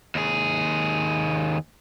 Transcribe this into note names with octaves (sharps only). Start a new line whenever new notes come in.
D#2 G#4